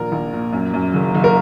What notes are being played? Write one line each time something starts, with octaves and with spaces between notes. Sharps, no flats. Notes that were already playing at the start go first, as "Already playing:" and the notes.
Already playing: A#1 A#2 A#4
A#1
A#2
F#2
F#2
F#1
F#1
A#4